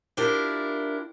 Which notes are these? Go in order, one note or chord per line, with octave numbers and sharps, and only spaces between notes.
D4 E4 F4 G4 A#4